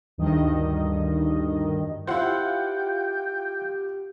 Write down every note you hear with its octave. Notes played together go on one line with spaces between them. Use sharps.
D2 G2 D#3 D#5
E4 F4 G4 C5 F#5 G5